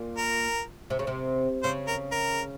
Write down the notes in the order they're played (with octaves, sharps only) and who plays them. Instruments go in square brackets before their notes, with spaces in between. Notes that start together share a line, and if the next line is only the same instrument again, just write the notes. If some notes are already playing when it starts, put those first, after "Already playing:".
Already playing: [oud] A#2
[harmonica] A#4
[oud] C3
C#3
C3
[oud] C#3 [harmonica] C5
[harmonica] A#4
A#4